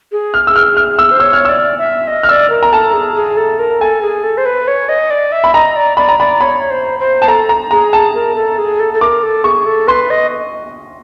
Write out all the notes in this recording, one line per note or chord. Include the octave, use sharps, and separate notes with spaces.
G#4
F6
E6
F6
F6
E6
C5
C#5 E6
F6
D5 E6
E5
D#5
F6
D5 E6
A#4
A#5
A4 A5
G#4
G#4
A4
A#4
A4 G#5
G#4
A4
C5
B4
C#5
D#5
D5
E5
B5
D#5 A#5
D5
D5 B5
A#5
D5 B5
C#5 B5
C5
C5
A5
A4 A#5
A#5
G#4 A#5
A5
A#4
A4
G#4
A4
A4
A#4 D6
A4
G#4 C#6
A4
B4 C6
D#5